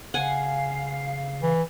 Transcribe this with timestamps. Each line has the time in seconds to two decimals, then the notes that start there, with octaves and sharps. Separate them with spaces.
0.14 C#3 F5 F#5 G#5
1.42 E3